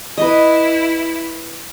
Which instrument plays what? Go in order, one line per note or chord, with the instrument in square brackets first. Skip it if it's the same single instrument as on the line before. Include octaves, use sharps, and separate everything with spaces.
[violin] E4 [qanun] B4 D#5